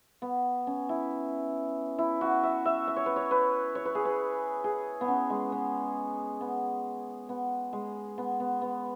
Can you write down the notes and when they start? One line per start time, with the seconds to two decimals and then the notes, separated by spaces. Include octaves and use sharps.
0.22 B3
0.67 C#4
0.89 E4
1.98 E4
2.21 F#4
2.43 E5
2.65 E5
2.87 E5
2.96 C#5
3.06 B4
3.16 C#5
3.31 B4
3.75 C#5
3.85 B4
3.95 G#4
4.05 B4
4.64 G#4
5.01 B3
5.08 C#4
5.30 G#3
5.52 B3
6.41 B3
7.29 B3
7.73 G#3
8.18 B3
8.40 B3
8.62 B3